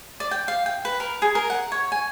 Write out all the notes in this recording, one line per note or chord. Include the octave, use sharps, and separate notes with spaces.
D5
G5
F5
G5
B4
A#4
G#4
A#4
F#5
C#5
G#5